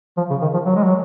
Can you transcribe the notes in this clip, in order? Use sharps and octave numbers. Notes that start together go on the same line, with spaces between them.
F3
C#3
D#3
F3
F#3
G#3
F#3